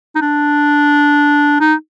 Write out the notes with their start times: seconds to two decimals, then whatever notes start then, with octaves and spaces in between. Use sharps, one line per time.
0.15 D#4
0.21 D4
1.60 D#4